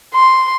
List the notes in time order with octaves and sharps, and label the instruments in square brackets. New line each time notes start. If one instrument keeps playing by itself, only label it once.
[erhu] C6